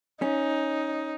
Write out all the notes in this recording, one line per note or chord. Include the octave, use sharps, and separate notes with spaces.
C#4 D#4